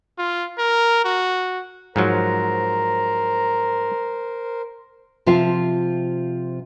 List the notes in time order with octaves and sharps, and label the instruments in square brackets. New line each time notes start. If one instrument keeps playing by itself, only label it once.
[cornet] F4
A#4
F#4
[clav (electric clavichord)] G#2 F3 F#3 [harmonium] A#4 C5 [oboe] A#5
[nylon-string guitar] C3 F3 F4 E5 F5 A5